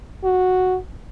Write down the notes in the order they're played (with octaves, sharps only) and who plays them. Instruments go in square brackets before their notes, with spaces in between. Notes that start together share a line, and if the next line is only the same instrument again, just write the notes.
[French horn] F#4